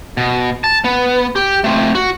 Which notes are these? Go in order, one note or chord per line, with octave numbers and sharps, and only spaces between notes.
B2
A5
B3
G4
A3 C4
F#4